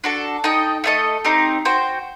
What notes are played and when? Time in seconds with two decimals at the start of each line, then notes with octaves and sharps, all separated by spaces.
0.04 D4 F#4 A4
0.44 D#4 A4 D#5 G5
0.84 A3 D4 A4 D#5
1.24 C4 D#4 G4
1.65 F#4 C5 G5